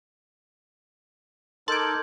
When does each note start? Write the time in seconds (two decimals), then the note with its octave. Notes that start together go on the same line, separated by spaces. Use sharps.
1.68 D#4 A4 A#4 A5 C6 D6 G6 G#6